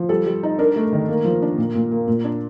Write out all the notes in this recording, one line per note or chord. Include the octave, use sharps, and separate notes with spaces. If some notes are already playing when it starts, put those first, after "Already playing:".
Already playing: F3
G3 A4
G3
D#4
D4 A#4
A3
D#3
A#3
F3
D4
A#2
A#2
A#3
A#2
D4